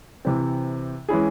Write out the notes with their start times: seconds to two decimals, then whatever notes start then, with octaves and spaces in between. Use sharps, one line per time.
0.25 C3 E3 C4
1.09 E3 G#3 C#4 E4 G#4